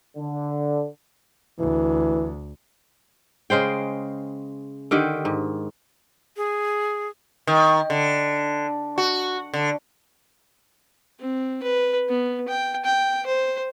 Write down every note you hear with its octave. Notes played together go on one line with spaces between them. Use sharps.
D3
D2 E3
C#3 G#3 C5 G5
D3 D#3 G4
G#2
G#4
D#3
D3
F#4
D3
C4
B4
B3
G5
G5
C5